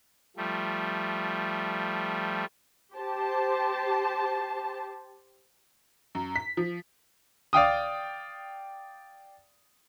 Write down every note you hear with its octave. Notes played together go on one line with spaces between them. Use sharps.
F3 G3 A3
G4 C5 A5
F#2
B6
F3
D5 F5 G5 D#6